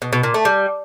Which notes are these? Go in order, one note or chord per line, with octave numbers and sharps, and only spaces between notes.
B2
B2
A#2
A3
G3